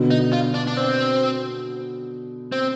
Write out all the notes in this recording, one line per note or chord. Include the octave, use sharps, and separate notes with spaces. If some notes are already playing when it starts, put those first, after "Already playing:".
Already playing: B2 D3
D#4
F4
D4
D4
C4
C4